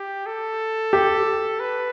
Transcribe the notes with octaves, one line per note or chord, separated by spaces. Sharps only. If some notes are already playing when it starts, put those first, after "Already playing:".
Already playing: G4
A4
G4
B4